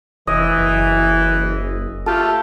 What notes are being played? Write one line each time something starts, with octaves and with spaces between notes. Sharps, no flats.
F1 E3 D#5
F#1
A3 F4 G4 A4